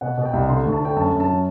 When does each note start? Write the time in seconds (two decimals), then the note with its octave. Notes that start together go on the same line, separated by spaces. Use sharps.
0.01 B2 F#5
0.18 B2
0.25 G5
0.33 C2
0.49 D3 C6
0.65 D2
0.72 A5
0.80 D3 G5
0.96 F#2 A5
1.12 F#2
1.20 A5
1.28 F#3